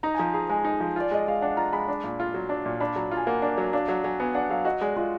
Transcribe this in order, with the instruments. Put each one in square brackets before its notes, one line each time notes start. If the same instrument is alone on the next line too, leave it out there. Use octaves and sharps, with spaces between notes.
[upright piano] D#4 [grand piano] A#5
[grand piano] G#5
[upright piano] F3 [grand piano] A#5
[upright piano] G#4 [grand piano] A#5
[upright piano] G#3 [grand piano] G#5
[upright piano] D#4
F3
[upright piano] F4 [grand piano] D5
[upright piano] G#3 [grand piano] D#5
[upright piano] G#3 [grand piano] F5
[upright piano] D4 [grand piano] F#5
[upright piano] F4 [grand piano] A#5
[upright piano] G#3 [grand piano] B5
[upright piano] D4
A#2
F4
F#3
D4
A#2
[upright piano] D4 [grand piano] B5
[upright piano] F#3 [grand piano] A#5
[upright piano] F4
[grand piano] G#5
[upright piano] A#3 [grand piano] F#5
[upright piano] D4
F#3
[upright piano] D4 [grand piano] F5
[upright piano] F#3 [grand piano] F#5
[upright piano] F#3 [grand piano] G#5
[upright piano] B3 [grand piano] G#5
[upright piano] D4 [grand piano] F#5
[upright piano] F#3 [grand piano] F5
[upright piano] F#4 [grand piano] D#5
[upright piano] G#3 [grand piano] D5
[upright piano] G#3 [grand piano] F4